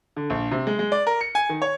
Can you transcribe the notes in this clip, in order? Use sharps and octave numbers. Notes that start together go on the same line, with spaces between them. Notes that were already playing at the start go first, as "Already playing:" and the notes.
D3
A#1
C3
G#3
G#3
D5
A#4
C#7
G#5
D#3
C#5